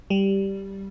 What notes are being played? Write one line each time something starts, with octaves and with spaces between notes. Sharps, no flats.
G3